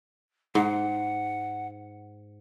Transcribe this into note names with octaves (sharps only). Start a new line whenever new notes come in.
G#2 F#5